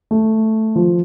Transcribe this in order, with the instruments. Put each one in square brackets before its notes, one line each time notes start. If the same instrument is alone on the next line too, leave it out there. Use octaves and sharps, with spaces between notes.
[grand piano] A3
F3